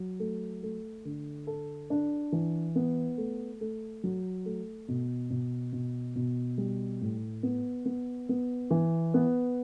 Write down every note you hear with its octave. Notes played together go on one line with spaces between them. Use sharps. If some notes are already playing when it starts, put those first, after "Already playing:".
Already playing: F#3
A3
A3
D3
A4
D4
E3
B3
A3
A3
F#3
A3
B2
B2
B2
B2
G3
A2
B3
B3
B3
E3
B3